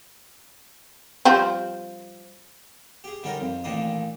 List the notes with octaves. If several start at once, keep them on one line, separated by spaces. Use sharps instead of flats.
F3 G3 C4
G4 G#4
D3 G3 C#4 D#4 A#4
F2
A1 A#2 D#3 A#3 D4 D#6